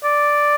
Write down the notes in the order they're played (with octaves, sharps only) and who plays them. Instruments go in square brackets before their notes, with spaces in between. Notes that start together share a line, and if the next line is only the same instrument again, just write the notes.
[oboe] D5